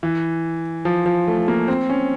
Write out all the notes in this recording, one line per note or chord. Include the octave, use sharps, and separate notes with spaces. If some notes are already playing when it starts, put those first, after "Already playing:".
E3
F3
F3
A3
A#3
C4
C#4